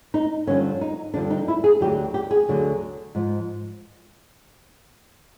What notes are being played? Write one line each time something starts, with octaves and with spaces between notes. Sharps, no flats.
D#4
G2 D3 F3 C#4
D#4
G2 D3 F3 D4
D#4
E4
G#4
D2 D3 F#3 G4
G4
G#4
D2 D3 F#3
G#2 F3